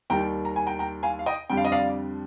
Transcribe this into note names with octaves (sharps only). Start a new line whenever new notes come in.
D#2 D#3 G3 G5 A#5
A#5
G#5
G5 A#5
G5 A#5
F5 G#5
F5
D#5 G5
F2 D3 G3 G5
F5
D#5
D5 F5